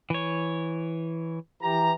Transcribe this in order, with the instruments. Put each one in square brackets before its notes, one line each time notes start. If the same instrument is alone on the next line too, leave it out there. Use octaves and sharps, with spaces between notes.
[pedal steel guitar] E3 C#5
[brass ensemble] E3 G4 A#5